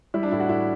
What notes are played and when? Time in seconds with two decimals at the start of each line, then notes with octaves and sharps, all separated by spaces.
0.14 G3 E4
0.23 D4
0.32 A2 E4
0.40 F#4
0.49 A2 E4